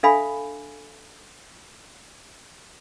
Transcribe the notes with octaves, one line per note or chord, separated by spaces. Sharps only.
D4 A4 E5 F5 G#5 B5